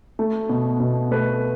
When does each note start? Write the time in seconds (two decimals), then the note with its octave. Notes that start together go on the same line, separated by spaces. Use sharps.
0.19 A3
0.49 B2
0.80 B2
1.11 A3 B4